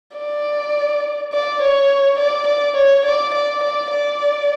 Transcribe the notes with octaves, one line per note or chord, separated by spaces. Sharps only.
D5
D5
C#5
D5
D5
C#5
D5
D5
D5
D5